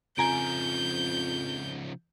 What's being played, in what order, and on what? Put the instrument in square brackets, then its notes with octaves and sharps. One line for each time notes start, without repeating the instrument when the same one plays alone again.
[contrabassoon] F2 [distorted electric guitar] C#3 F3 [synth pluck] G#5 A#5 D7 [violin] G6